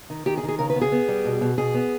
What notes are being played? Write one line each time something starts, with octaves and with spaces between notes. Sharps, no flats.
D#3
D#3 G4
G#4
D#3
G#4
C#3 A#4
B4
B3
G#4
B3
G3
B2
B2
B2 G#4
B3